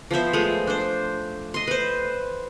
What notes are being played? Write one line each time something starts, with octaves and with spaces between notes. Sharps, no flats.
F3 B3 C5 E5
F3 G#3 A3
D4 C5
D#5 C6
B4 C5